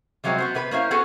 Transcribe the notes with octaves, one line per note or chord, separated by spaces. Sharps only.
C3 F3 F#3 G#3 C4
B3 F#4 C5
C3 B3 B4
A#3 C#4 E4 C5 F5
B3 C#4 F#4 G#4 A4 B4